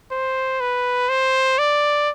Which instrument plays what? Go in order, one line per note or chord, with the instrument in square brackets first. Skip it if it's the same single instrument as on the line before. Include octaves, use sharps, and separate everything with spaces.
[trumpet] C5
B4
C5
D5